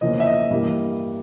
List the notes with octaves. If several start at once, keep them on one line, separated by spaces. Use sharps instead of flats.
E2 C#3 F3 A#3 C#4 D#5
E5
D#5
G2 E3 G3 A#3